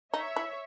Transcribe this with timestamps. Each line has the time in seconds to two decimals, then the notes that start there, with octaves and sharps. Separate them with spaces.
0.14 D#4 C#5 E5
0.36 E4